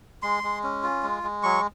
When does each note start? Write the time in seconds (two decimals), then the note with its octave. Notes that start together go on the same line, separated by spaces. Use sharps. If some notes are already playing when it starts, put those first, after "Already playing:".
0.23 G#3 C6
0.43 G#3
0.64 C#4
0.83 F4
1.03 G#3
1.23 G#3
1.43 F#3 C#6